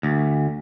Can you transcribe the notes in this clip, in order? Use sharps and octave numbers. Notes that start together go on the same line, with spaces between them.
D2